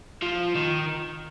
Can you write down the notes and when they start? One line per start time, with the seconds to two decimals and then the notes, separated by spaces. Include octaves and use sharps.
0.23 F3
0.55 D#3